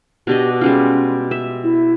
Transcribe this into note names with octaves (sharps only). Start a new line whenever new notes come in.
B2 D4 G4 D#5
G3 G#3 C#4 F4
E5
E4